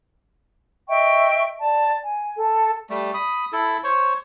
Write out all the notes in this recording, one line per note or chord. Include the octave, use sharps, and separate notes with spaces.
D#5 E5 G5 C#6
D5 A5
G#5
A4
G3 A3
B5 D#6
E4 A4
C5 C#5 C#6